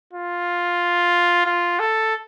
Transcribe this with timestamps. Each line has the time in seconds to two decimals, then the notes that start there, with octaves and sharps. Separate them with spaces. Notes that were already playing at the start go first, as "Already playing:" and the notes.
0.13 F4
1.46 F4
1.79 A4